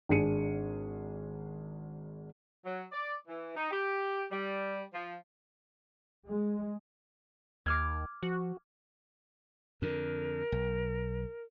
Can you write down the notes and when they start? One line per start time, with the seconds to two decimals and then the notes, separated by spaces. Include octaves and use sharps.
0.09 G#1 D4 G#4 C#7 D#7
2.65 F#3
2.92 D5
3.27 E3
3.56 D#4
3.71 G4
4.31 G3
4.93 F3
6.27 G#3
7.66 D#2 D6 F6 G#6
8.23 F3 F#4
9.82 F2 D3 A#4
10.52 B1